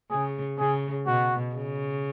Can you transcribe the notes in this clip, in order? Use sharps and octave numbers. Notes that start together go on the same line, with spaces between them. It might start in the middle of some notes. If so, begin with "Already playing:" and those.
C#3 G#4
C#3 G#4
B2 F#4
C#3